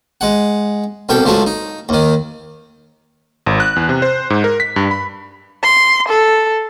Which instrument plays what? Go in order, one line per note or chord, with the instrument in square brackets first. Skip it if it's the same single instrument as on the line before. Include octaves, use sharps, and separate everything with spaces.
[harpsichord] G#3 F#5
C2 B2 A4 G5
C#2 F3 F#3 A3
D#4
D#2 D#3
[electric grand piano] G#1
F#6
E2
C3
C5
G#2
A#4
B6
G2
B5
[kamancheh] C6
A4